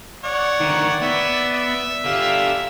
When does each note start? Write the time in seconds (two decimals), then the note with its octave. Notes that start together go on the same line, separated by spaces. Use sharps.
0.24 C#5 D5 F#5
0.61 D2 D#3
1.02 B3 E5
1.55 E5
2.04 D3 F4 G4 F5